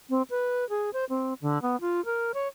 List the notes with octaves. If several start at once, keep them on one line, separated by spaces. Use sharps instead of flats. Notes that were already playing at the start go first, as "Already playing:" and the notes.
C4
B4
G#4
C5
C4
D3
B3
F4
A#4
C#5